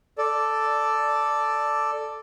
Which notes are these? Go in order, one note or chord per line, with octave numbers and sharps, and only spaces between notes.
A4 D5